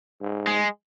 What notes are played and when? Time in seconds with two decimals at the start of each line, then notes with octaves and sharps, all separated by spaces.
0.21 G#2
0.47 G#3